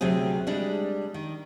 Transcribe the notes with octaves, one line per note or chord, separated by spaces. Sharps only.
D2 C3 F#3 C4 G#4
G3 G#3 D4
D#3